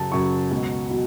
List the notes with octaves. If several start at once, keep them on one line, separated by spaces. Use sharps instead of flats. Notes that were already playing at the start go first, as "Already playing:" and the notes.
Already playing: F#2 C#3 F#3 A5
F#2 C#3 F#3 C#6
C#2 B2 F#3
B2 F#3